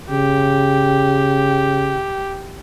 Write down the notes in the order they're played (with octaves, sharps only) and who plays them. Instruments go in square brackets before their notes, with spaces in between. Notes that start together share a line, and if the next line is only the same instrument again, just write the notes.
[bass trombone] C#3 [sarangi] G4